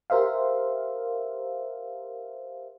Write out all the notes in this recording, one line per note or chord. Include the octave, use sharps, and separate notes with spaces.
G4 A#4 C5 E5 F5